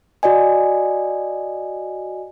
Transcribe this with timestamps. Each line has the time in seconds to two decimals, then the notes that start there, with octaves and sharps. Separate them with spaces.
0.23 F#4 D5 D#5 G#5